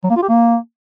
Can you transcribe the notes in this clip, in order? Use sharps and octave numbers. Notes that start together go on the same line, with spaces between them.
F#3
A#3
F4
G4
A#3